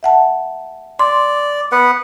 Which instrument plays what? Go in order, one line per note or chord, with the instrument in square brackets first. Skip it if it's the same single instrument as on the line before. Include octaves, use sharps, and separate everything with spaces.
[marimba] E5 F#5 A5
[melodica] D5 [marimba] C6
[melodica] B3 B4 F#5